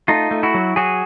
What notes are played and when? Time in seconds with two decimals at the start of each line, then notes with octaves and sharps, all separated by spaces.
0.08 A3 D#4 F4
0.31 A3
0.43 E4 F#4
0.54 F#3
0.76 F#3 F#4 G#4